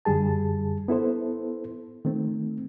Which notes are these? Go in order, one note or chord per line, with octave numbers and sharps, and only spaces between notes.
F#2 D3 G3 G#4 A5
B3 E4 A4 C5
D#3 A3 C4